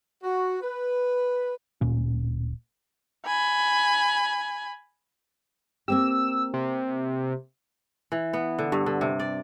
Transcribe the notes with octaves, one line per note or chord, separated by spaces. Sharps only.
F#4
B4
D1 A#2 C#4
G#5 B5
A#3 C4 G4 E6
C3
E3
B3
D3
G2
D3
C3
D5